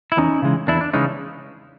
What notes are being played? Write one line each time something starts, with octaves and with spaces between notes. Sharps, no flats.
E4
E2 C#4 D#4
C#3 E3 G#3
E2 D4 E4
D4
C#3 E3 G#3 C#4 D#4